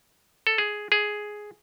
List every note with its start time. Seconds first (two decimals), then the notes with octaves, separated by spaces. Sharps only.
0.47 A4
0.58 G#4
0.92 G#4